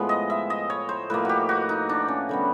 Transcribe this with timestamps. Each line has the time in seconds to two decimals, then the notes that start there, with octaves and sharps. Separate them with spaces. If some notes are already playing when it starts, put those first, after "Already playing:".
Already playing: A2 F3 G#3 B3
0.09 D#5
0.30 E5
0.50 D#5
0.70 C#5
0.89 C5
1.10 A2 F3 A#3 B4
1.25 F#4 G4
1.49 F#4
1.69 D#4
1.89 D4
2.08 C#4
2.29 D3 G3 B3